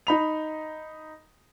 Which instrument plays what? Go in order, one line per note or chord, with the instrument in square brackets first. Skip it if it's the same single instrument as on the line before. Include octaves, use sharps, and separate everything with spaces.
[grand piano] D#4 B5 F7